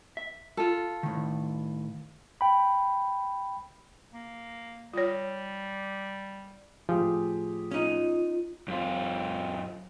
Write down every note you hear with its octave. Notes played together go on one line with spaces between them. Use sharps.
E5
F4 A4
A2 D#3
G5 B5
A#3
G3 F4 C#5
A2 F3 G4 G#4
C#4 D#4 F4
F#2 F4